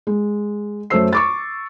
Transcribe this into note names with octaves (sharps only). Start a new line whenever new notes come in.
G#3
F#2 A3 A4 C5 E6 C7
C#6 D6 A6